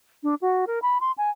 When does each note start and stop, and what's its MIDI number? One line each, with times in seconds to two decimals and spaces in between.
0.23 0.35 62
0.42 0.65 66
0.67 0.79 70
0.82 0.98 83
1.01 1.12 84
1.18 1.30 80